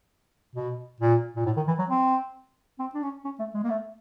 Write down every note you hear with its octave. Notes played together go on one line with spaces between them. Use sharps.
B2
A#2
A#2
A2
D#3
E3
F#3
C4
C4
D4
C#4
C#4
A3
G#3
A#3
A3